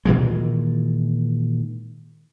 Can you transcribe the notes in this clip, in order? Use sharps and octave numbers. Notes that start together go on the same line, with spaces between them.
A#2 D#3 E3 G#3